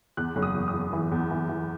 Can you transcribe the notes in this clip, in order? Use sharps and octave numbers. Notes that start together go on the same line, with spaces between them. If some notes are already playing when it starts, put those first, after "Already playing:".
E2 F#6
F#1
D#6
E2
D#6
E2
E3
E2
E3
E3